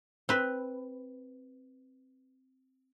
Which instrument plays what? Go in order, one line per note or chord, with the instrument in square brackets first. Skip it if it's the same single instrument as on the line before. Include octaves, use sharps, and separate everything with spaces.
[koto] C4 B4